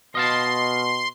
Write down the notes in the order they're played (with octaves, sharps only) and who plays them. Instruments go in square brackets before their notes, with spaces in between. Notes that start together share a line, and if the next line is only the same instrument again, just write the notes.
[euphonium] B2 [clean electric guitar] D#5 F5 A5 [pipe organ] C6